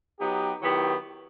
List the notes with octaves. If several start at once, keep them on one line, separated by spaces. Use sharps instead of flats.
F#3 B3 D#4 G4
D#3 F#3 B3 E4 G4